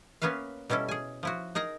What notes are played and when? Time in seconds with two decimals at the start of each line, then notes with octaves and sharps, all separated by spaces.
0.22 A#3 B3 C#4 B4 E5 F5
0.70 B2 G3 C#4 E4 A4
0.88 G#4 G#5
1.23 F3 E4 F#4
1.55 D#4 G#4 A#4 A#5